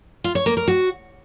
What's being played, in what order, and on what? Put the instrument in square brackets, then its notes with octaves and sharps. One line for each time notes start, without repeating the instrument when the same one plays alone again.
[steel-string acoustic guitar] F4
C#5
A#3
A#4
F#4